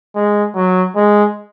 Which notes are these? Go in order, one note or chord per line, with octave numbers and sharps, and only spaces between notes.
G#3
F#3
G#3